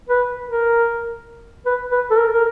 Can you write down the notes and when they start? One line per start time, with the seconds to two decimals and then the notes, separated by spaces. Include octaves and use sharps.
0.09 B4
0.48 A#4
1.66 B4
1.92 B4
2.11 A4
2.18 A#4
2.34 A#4